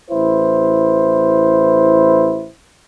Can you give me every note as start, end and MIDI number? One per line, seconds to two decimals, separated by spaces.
0.11 2.50 33
0.11 2.50 64
0.11 2.50 71
0.11 2.50 72